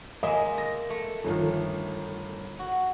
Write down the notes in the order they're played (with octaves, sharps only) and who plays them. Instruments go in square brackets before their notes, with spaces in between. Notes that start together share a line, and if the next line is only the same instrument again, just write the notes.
[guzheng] G#3 A#3 E5 [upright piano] D#5 G#5
[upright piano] A#6
[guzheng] A3
[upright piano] G1 D#3 F3
[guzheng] F#4